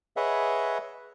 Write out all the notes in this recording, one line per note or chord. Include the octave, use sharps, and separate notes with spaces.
G#4 B4 C#5 D#5 E5 F#5